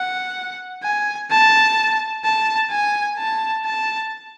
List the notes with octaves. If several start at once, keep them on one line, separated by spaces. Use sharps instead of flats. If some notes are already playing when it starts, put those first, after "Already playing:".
Already playing: F#5
G#5
A5
A5
G#5
A5
A5